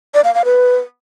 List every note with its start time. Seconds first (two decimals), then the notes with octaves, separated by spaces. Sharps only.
0.14 D5
0.24 F5
0.35 F5
0.45 B4